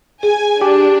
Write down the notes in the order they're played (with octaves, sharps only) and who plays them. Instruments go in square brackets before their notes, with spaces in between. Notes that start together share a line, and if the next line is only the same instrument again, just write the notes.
[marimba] G#4 [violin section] G#5
[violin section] D4 [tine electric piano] G4